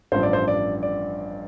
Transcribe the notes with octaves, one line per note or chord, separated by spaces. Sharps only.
A1 G2 F3 C5
D5
C5
D5
D5